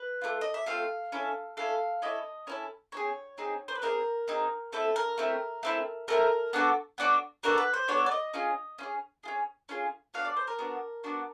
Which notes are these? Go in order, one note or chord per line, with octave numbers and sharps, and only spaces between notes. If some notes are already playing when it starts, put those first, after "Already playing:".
Already playing: B4
A3 C4 F4
D#5
E5
A3 C4 F4 F5
C#4 E4 A4
C#4 E4 A4 F5
C#4 E4 A4 D#5
C#4 E4 A4 C#5
C4 D#4 G#4 C#5
C4 D#4 G#4
C5
B4
C4 D#4 G#4 A#4
C4 D#4 G#4
A3 C4 E4 A4
A#4
A3 C4 E4
A3 C4 E4
A3 C4 E4 A#4
B3 D4 F#4 A4
B3 D4 F#4 A4
B3 D4 F#4 A4 A#4
B4
C5
B3 D4 F#4 A4 C#5
D5
D#5
C#4 F4 G#4
C#4 F4 G#4
C#4 F4 G#4
C#4 F4 G#4
B3 D4 F#4 F5
D5
C5
A#4
B3 D4 F#4
B3 D4 F#4